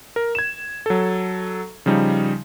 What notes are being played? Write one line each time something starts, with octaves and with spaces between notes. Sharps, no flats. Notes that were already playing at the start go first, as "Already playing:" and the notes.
A#4
G#6 E7
F#3 A4
C#3 F3 G3 D#4